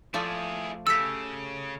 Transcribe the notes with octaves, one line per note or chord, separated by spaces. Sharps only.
F3 A3 E4 G#4 D5
C#3 G4 A4 E6 B6